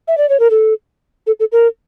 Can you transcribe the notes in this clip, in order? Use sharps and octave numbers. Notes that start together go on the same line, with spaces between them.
E5
D5
C#5
A#4
A4
A4
A4
A#4